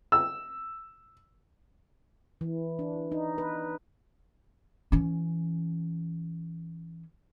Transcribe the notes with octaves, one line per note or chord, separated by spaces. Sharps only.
E6
E3
D4
D#4
B4
E3 C#4